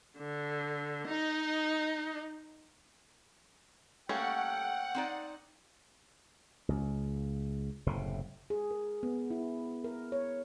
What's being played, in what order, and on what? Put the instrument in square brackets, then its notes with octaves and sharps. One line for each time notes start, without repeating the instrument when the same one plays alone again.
[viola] D3
D#4 D#5
[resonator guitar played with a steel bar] G3 A4 [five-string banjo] A3 A#3 C#4 [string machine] F#5 [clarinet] G5
[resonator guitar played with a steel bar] C4 D#4 D5
[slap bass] C#2
F#1 A2 C3
[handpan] G#4
A#4
B3
E4
A#4
C#5